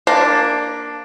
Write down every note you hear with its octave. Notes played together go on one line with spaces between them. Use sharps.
A#3 D4